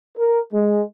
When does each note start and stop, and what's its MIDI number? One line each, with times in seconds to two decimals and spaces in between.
0.17 0.40 70
0.52 0.83 56